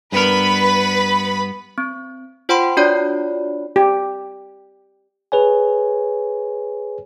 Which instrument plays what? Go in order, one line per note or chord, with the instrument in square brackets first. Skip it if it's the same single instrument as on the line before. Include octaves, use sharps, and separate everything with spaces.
[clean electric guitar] G2 B3 A#4 [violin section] B4 B5
[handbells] C4
F4 C5 F#5 G5 B5 C6
D4 F4 F#4 C#5 D5 B5
[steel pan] G4
[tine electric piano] G#4 B4 C#5 G#5